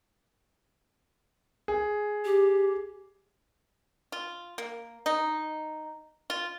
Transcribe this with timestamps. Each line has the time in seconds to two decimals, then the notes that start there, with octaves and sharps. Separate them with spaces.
1.68 G#4
2.25 G4
4.12 F4
4.58 A#3
5.06 D#4
6.30 F4